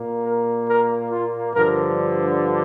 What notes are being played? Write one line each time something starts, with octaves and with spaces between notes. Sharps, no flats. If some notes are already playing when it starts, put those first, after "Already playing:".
Already playing: A#2 A#3
A#4
A#4
F4
G2 D3 F3 A#4